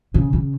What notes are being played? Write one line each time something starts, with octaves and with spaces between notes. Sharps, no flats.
C#3
C#3